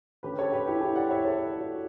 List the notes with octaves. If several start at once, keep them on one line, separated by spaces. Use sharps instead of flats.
D3 A3 C#4 G4 B4
A4 C#5
G4 B4
E4 G4
E4 G4
D5 F#5
C#5 E5
A4 C#5
F#4